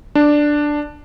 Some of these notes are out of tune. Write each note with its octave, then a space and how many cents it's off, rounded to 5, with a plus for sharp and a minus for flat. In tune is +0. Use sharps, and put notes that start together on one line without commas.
D4 +5